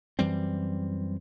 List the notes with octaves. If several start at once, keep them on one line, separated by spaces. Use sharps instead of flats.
F#2 E3 G3 C4